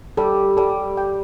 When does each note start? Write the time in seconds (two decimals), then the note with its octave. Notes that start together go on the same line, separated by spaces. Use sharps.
0.17 G3 A4
0.57 G3 A4
0.97 G5